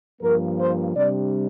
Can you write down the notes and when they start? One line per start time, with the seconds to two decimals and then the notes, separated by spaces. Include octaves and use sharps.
0.22 G2 F3 A#3 A#4
0.59 C5
0.95 C3 G3 D4 D5